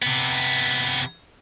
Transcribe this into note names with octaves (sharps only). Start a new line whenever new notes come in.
C3 B3